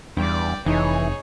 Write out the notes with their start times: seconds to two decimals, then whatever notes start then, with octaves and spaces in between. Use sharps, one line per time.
0.17 E2 G2 D5 G5
0.66 F1 E3 D#4 G#4 C#5